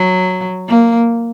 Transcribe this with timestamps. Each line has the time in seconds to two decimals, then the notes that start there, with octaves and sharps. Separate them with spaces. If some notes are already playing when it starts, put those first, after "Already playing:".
Already playing: F#3
0.68 A#3